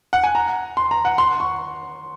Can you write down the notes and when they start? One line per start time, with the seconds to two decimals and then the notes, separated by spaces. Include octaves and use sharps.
0.13 F#5
0.24 G#5
0.35 A#5
0.77 C6
0.91 A#5
1.05 F#5
1.18 C6
1.40 C#6